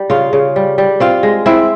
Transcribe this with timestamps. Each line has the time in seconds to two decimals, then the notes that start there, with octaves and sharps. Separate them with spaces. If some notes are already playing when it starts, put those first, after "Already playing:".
Already playing: G3 G4 G5
0.10 C#3 F4 F5
0.33 C#3
0.56 G3
0.78 G3
1.00 C4 F4 F5
1.23 G#3
1.46 C4 E4 E5